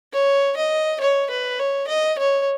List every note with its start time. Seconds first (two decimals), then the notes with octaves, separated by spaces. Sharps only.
0.13 C#5
0.57 D#5
1.01 C#5
1.30 B4
1.60 C#5
1.88 D#5
2.18 C#5